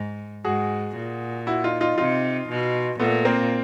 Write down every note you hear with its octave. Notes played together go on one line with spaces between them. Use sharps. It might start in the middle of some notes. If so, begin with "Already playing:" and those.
Already playing: G#2
G#2 F#4 G#4
A#2
E4 F#4
D#4 F4
D#4 F4
C3 D#4 F4
B2
A#2 A3 B3
A#3 C4